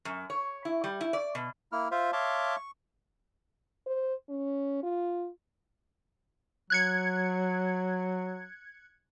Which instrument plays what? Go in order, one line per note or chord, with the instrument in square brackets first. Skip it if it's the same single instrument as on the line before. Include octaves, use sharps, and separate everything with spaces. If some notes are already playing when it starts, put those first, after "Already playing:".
[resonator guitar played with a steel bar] F#2
C#5
E4
G3
E4
D5
B2
[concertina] A#3 E4 F6
F4 C5 E5 F5
C#5 E5 F5 A5 C6 D6
C#6
[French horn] C5
C#4
F4
[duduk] F#3 [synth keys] F#6 G#6 C#7